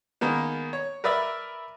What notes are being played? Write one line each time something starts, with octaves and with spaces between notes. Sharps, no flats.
D#3 G#3 A#3 B3
C#5
A#4 B4 D5 E5